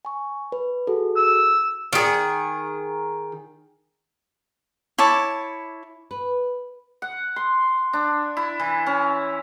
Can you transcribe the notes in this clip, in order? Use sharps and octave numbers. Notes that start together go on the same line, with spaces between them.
G#5 C#6
B4
F#4 G#4 A4
E6
D#3 G#4
E4 C#5 A5 D6
B4
F#5
C6
D4
E4
E3
C#4